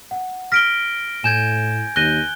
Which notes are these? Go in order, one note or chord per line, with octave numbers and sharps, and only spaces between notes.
F#5
F6 A#6 B6 D7 G7
A2 G#5 G6 G#6 E7
D#2 F#6 G6 A#6 D#7 G7